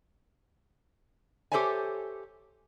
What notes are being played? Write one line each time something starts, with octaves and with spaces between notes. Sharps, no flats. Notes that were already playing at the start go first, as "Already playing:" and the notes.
G4 A4 C5 C#5 E5 G#5